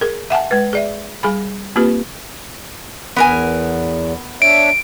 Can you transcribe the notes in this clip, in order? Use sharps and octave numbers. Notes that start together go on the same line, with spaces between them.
G#4 A#4
E5 F#5 G#5 A5
G#3 B4
G#4 D5 E5
G3 G#4 G#5 B5
A#3 C4 F4 G4 B4
E2 B3 A#4 G#5
D4 C#5 E5 D7